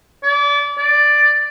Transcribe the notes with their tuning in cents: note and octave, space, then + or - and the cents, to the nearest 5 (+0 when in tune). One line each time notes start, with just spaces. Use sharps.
D5 -30
D5 +5